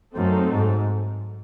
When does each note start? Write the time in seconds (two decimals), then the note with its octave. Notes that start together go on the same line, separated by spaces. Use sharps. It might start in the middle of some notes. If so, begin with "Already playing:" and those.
0.15 F#2 F#3 A3 C4 D#4 A4
0.51 G#2